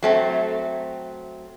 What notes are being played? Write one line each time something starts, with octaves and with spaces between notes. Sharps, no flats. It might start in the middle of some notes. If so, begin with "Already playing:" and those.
F#3 A3 C4